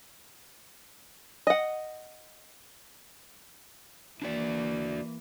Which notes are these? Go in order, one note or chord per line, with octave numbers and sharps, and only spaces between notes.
D#5 F#5
E3 A#3 D4 F#4 D5